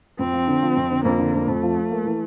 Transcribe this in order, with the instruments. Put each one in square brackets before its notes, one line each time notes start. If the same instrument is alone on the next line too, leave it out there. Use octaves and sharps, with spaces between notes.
[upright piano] F2 [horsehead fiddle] C4
[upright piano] F3
D3
F3
F2
D3
[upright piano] F2 [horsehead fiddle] A#3
[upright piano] D3
F2
[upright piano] F2 [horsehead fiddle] A3
[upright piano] F3
F3
A#3
E3